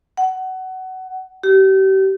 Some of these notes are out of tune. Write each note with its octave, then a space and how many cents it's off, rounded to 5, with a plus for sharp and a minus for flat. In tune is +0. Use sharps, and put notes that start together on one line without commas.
F#5 +20
G4 -35